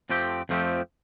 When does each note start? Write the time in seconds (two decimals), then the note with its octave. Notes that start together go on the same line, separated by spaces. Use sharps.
0.10 F2 F3 A3 C4 G4
0.49 F2 F3 A3 C4 G4